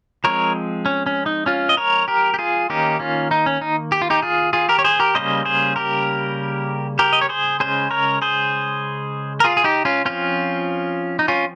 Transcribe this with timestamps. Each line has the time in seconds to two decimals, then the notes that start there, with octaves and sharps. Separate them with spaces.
0.24 F3 G#3 C4 A#4 C#5
0.86 C#4
1.06 C#4
1.26 D#4
1.46 C#4 F4
1.69 D#5
1.77 A#4 C#5
2.08 G4 A#4
2.34 G4
2.39 F4 G#4
2.70 D#3 A#3 C#4 D#4 G4
3.00 C#4 F4
3.31 D#4
3.46 C#4
3.61 D#4
3.92 G4
4.02 F4
4.10 D#4 G4
4.22 F4 G#4
4.53 F4 G#4
4.69 G4 A#4
4.79 C#5
4.84 G#4 C5
5.00 G4 A#4
5.15 C#3 G3 A#3 C#4 C5 D#5
5.45 G#4 C5
5.76 G4 A#4
6.99 G4 A#4
7.13 D#5
7.21 C#5
7.29 G#4 C5
7.60 C#3 G#3 C#4 G#4 C5
7.91 A#4 C#5
8.22 G#4 C5
9.40 A#4
9.44 F4 G#4
9.57 G#4
9.64 D#4 G4
9.85 C#4 F4
10.05 F3 C4 C#4 F4
11.19 D#4
11.28 C#4 F4